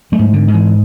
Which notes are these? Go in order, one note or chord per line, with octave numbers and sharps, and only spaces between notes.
F#3 A3
G#2
D3
G#2
E3